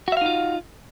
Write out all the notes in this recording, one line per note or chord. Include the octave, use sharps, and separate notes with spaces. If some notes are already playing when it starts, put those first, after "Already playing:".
D#4 F4 F#4 E5 F5